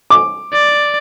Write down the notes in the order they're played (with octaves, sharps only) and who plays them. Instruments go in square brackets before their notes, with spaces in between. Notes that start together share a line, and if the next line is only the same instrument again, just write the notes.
[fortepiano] D6
[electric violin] D5